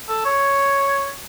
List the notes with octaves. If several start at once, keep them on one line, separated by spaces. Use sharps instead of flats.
A4
C#5